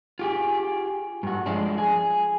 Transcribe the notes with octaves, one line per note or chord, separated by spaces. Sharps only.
F4 G4 G#4
G2 F#4
F3 G#3 D4
G#4